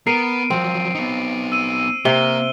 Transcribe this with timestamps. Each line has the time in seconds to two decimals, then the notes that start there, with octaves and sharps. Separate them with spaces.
0.07 B3 A#4 C7 D7 D#7
0.50 F3 F#3 C4
0.95 B3 D#4
1.52 E6 D#7
2.05 C3 A#3 G7